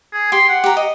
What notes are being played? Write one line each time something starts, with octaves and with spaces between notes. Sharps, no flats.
G#4
G4 C6
F#5
G4 A#5
D#5